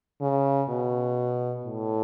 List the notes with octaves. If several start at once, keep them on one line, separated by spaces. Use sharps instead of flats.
C#3
B2
A2